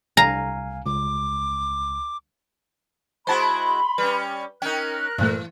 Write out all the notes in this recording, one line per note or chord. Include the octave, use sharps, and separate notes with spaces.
C2 F5 G#5 A#5
C#2 D6
G#3 E4 F#4 C5 A5 B5 C6
G3 C#4 B4
C#4 D#4 A#4 G5 F#6
G2 A#2 E3 A3